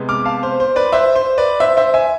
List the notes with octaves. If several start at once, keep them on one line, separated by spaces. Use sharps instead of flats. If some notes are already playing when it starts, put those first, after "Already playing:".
Already playing: C3 G#3 B3
D6 F6
F5 A5
C5
C5
B4 D5
C5 E5
C5
B4 D5
C5 E5
C5 E5
E5 G#5